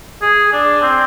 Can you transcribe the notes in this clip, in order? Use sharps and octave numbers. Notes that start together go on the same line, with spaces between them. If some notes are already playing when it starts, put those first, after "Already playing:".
G#4
D4
C4